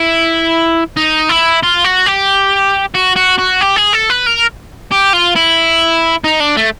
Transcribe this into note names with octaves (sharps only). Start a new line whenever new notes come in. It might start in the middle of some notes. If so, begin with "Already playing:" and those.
Already playing: E4
D#4
E4
F4
F#4
G4
F#4
F#4
F#4
G4
G#4
A4
B4
A#4
G4
F4
E4
D#4
D4
A3